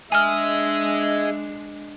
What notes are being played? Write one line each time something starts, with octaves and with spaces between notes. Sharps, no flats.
G#3 D4 G#4 D#5 E5 G#5 F6